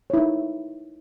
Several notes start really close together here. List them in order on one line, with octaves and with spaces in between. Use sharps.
C#5 E4 D#4